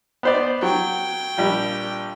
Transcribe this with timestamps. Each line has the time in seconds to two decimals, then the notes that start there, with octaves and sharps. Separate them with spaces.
0.23 B3 C5 D5
0.62 F#3 G5
1.38 A#1 G3